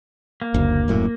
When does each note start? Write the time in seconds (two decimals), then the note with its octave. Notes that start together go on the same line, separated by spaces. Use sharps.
0.42 A#3
0.54 F#1 D2
0.88 D#1 F#2 A2